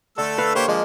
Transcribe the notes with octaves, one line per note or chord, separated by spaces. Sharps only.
D3 A3 A4 E6
B4 F5
A#3 G4 C5 C#5
F3 G#3 A#3